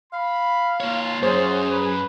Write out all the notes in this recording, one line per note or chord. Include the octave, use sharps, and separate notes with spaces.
F5 B5
A#3 F4 C#5
F#2 G#4 C5 C#5
B4